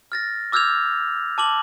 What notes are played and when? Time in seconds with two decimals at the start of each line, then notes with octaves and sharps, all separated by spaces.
0.12 F6 A6 A#6
0.52 D6 E6 F6 G6 G#6 F7
1.38 A5 D6 F#7